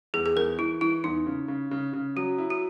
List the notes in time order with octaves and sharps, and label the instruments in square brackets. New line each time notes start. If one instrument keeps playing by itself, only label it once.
[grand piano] E2 [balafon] G#4
[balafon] G#4
[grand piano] E2 [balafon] A#4
[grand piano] E3 [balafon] E4
[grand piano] E3 [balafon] E4
[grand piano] E2 [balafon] D#4
[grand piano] C#3
C#3
C#3
C#3
[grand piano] F#3 [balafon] F#4
[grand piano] E4
[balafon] F#4